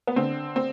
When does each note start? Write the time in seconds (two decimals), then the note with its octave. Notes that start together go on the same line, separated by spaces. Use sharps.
0.07 B3
0.16 D3 C4
0.56 C4